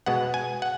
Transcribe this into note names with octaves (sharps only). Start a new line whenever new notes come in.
B2 G#3 B3 F#5
G#5
F#5